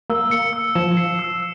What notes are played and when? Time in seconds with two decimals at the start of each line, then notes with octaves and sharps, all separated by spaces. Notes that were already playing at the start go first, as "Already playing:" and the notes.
0.10 A#3 E6
0.31 C#7
0.53 E6
0.75 F3 E7
0.97 C7
1.19 E6